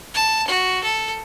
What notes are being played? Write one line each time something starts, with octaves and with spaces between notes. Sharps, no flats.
A5
F#4
A4